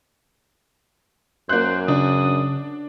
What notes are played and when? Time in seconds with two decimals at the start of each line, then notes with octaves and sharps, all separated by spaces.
1.49 F#2 A#3 C5 F#6
1.88 C#3 D4 D#6